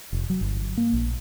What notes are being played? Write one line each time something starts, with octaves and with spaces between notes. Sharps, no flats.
F1
F#3
G1
A#3
A#1